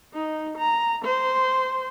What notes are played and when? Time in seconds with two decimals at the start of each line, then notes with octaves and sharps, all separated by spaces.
0.14 D#4
0.58 A#5
1.05 C5